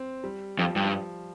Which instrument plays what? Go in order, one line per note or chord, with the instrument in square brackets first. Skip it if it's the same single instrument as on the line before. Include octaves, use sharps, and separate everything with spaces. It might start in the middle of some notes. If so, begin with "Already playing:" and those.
Already playing: [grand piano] C4
G3
[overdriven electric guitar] F2 [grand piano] F3
[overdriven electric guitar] G2